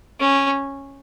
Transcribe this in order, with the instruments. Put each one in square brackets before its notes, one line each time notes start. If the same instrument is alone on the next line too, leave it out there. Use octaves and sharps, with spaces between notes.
[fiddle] C#4